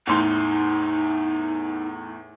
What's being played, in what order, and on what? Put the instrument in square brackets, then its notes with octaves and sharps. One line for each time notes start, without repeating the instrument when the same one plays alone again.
[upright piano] E2 A2 C6 [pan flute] D#4